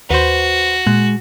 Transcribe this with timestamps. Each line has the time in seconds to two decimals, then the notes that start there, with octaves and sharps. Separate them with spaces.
0.10 D#2 F#4 B4 C5
0.87 A#2 G#3 F#6